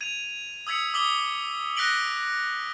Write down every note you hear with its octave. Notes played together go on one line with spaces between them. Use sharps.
G#6 D#7 F7
D#6 E6 G#6 B6 C#7
D6 D#6 B6 F#7 G7
F#6 A#6 B6 D7 F#7 G7